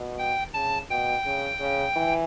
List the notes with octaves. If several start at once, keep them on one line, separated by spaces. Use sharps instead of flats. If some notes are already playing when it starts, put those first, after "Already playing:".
Already playing: B2
G5
C#3 A5
B2 G5
C#3
C#3
E3